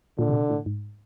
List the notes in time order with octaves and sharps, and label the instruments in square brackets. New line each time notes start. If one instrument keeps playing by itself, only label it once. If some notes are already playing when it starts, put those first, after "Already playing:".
[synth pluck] A#2 [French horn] D3
[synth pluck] C3
B2
A2
G#2